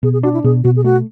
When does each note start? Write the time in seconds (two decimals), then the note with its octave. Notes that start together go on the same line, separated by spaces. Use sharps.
0.03 B2 G#4
0.13 G#4
0.23 D4 F#4
0.34 E4
0.44 B2 G#4
0.64 B2 F#4
0.76 G#4
0.84 A3 F#4